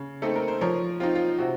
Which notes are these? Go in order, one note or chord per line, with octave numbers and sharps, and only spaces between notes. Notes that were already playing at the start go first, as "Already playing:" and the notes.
Already playing: C#3
A3 C4 D#4 A4
A#4
C5
F3 A#4 C#5
C4 D#4 F4
F4
C3 F#4